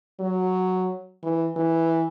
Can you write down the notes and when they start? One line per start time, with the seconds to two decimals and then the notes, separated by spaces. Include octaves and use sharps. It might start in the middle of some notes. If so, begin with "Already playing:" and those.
0.20 F#3
1.23 E3
1.57 E3